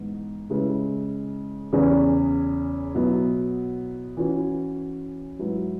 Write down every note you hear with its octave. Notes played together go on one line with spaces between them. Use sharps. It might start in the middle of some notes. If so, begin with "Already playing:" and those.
Already playing: G#2 E3 B3
C#3 G#3 E4 B4
E2 C#3 E3 C#4
B2 F#3 B3 E4
E3 C#4 F#4
G#2 F#3 E4 B4